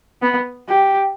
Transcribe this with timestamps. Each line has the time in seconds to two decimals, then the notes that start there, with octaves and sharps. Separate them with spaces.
0.21 B3
0.69 G4